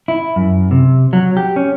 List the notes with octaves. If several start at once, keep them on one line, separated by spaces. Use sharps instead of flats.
E4
F#2
C3
F#3
G4
C#4